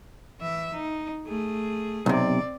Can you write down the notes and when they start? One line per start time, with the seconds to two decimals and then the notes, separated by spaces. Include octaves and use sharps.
0.40 E3 E5
0.73 D#4
1.26 A3 G#4
2.06 B1 C3 C4 D5